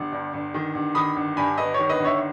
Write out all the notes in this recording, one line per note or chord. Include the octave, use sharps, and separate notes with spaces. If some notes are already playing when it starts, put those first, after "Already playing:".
Already playing: G1
G2
G1
D#3
G1
D#3 B5 D#6
G1
G2 G#5 B5
G1 B4 D#5
D#3 C#5
B4 D#5
G1
C#5 E5